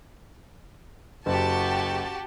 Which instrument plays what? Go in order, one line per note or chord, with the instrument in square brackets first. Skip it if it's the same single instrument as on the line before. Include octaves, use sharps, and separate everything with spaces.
[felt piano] F#1 [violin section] F#4 G4 A5